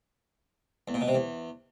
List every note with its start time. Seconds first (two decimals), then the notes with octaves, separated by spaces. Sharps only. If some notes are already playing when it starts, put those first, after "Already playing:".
0.88 E2
0.94 A#2
1.01 B2
1.08 C3
1.15 E2